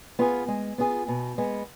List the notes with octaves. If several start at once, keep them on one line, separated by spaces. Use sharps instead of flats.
B3 F4 G#4
G#3
B3 F4 G#4
B2
G#3 B3